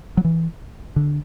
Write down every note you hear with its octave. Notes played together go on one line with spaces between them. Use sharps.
F#3
E3
D3